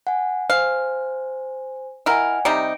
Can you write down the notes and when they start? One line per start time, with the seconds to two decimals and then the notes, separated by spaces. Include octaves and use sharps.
0.07 F#5 G#5
0.50 C5 F5 G#5
2.06 E4 A#4 D#5 F#5 G#5
2.45 C3 G3 D#4 D7